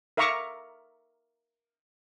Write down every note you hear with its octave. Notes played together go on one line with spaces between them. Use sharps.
A#4 E5 F5 A#5 C#6 D6